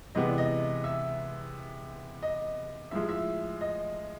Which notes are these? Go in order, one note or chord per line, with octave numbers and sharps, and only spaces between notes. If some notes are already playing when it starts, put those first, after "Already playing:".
C3 E3 G#3 B3 D#5
D5
D#5
E5
D#5
A2 F3 G#3 E5
E5
D#5